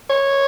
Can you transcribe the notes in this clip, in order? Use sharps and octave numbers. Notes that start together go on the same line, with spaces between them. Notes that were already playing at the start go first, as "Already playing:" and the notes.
C#5